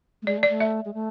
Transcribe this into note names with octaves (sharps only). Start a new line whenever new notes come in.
A3
G#3 D5
A3
D5
A3
E5
G#3
A3